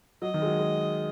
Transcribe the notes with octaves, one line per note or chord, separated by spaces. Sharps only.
F#3 D#5
D#3
G#3
F#3
G#3